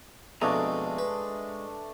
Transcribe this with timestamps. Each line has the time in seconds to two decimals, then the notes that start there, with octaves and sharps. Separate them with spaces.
0.42 F2 B2 G#3 A3 D4 D#5 A#5
0.99 B4